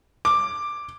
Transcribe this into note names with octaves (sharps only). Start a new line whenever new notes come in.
D6